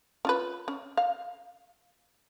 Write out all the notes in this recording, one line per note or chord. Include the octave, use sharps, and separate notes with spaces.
C#4 F4 B4
C#4
F5